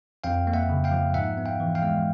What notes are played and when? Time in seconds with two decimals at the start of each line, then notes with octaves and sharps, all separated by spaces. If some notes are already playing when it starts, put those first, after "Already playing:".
0.24 F2 F5 G5
0.47 A#3
0.54 E5 F#5
0.69 C#3
0.84 F5 G5
0.91 F3
1.14 G#2 E5 F#5
1.37 B3
1.46 F5 G5
1.60 E3
1.75 F5 G5
1.82 G#3